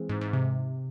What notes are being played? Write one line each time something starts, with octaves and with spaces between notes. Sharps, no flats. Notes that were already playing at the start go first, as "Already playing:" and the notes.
Already playing: E3 G#3 C4
G#2
G#2
C3